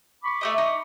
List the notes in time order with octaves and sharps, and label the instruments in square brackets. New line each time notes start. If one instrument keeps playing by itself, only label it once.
[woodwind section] B5 C#6 D6
[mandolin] A3 C4 D#5
D#4